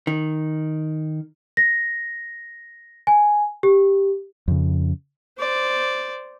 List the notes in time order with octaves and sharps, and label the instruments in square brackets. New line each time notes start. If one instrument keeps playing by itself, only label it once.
[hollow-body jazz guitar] D#3
[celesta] A#6
G#5
G4
[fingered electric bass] F2 C#3
[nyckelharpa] C5 D5